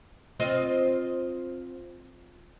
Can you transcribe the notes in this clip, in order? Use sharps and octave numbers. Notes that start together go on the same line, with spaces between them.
C4 F4 D#5